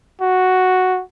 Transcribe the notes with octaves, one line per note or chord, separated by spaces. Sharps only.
F#4